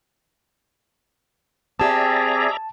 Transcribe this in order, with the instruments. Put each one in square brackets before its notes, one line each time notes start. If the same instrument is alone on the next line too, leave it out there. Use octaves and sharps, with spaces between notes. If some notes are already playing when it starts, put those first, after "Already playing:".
[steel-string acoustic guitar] C4 G4 [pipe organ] G#4 [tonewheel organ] D5 E5 A#5 [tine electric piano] A5